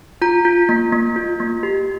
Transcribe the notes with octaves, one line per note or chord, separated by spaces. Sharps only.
F4 A#5
F4
A#3
A#3
F4
A#3
G4